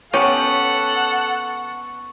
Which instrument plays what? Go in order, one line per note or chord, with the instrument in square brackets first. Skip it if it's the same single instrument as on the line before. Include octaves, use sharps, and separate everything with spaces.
[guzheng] B3 [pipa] C#4 G4 [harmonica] A4 F#5 [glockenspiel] C#6